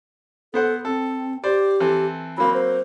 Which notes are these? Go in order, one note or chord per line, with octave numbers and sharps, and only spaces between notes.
B3 A4 C5 F#5
C4 A4
G4 C5 D5
E3 C4 A4
F#3 A#3 C4 B5
C5